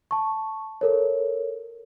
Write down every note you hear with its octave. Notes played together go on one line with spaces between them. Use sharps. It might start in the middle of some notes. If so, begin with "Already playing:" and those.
A5 C#6
A4 A#4 C#5